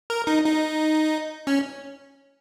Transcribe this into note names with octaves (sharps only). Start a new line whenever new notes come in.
A#4
D#4
D#4
C#4